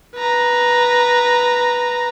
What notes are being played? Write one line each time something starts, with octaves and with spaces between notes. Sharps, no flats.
B4 A#5